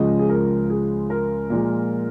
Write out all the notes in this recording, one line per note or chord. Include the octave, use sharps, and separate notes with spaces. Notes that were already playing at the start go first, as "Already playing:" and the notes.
Already playing: C#2 C#3 F3 G#3 D#5
G#4
A#4
G#4
A#4
A#2 F3 G#3